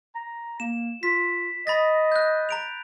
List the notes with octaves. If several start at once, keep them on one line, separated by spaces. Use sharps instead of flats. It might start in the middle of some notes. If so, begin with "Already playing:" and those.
A#5
A#3 E7
F4 B6
D#5 B5 A6 A#6
F#6 G6
A#5 D7 F7